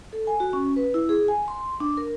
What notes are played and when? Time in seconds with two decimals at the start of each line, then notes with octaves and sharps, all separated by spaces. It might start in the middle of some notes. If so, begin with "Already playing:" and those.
0.13 A4
0.27 G#5
0.40 F#4
0.53 C#4
0.76 B4
0.94 E4
1.09 G#4
1.28 G#5
1.48 C6
1.80 D4
1.97 A#4